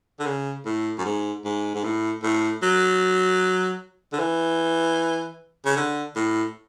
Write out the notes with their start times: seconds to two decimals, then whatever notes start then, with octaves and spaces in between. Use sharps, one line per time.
0.20 D3
0.26 C#3
0.66 A2
0.98 F#2
1.05 G#2
1.45 G#2
1.75 G#2
1.84 A2
2.23 A2
2.63 F#3
4.13 D3
4.19 E3
5.66 C#3
5.76 D3
6.16 A2